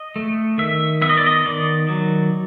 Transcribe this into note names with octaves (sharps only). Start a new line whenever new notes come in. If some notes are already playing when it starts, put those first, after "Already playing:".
Already playing: D#5
A3
D#3 E5
B3 E5
D#5
D5
D#5
D#3 D5
F#3